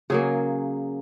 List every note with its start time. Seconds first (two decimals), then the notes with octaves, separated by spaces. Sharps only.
0.10 C#3 F#3 A#3 G#4